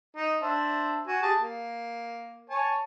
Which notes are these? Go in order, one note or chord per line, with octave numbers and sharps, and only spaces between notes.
D#4
D4 C5 E5
F#4 G#5
G4 G#4 A5
A#3
C#5 G#5 A5